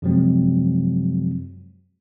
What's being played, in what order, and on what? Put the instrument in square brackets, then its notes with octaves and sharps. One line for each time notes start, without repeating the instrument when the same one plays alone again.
[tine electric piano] F#2 C3 F3 F#3 G#3 C4